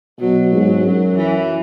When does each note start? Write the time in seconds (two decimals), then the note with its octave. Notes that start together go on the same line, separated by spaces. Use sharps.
0.20 B2 F#3
0.53 G#2
0.85 F#2
1.17 E3